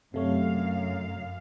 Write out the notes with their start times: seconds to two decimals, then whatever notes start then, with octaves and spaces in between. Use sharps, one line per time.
0.14 F#2 C3 A3 C#5 F5